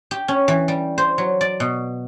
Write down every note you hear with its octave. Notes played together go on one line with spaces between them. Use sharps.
G4
C#4
E3
G3
C5
F#3
D5
B2